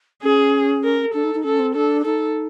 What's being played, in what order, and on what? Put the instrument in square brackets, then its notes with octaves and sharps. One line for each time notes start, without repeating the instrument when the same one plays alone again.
[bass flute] C#4 [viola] G#4
[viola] A#4
[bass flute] D4 [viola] A4
[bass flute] D#4
D#4
[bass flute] C#4 [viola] A4
[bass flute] C4
[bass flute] D4 [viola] A4
[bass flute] D#4 [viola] A4